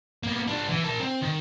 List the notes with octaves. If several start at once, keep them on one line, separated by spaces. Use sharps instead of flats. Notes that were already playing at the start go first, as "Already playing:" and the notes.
A#3 B3
D4 F4
E3
A#4 A5
C4
D#3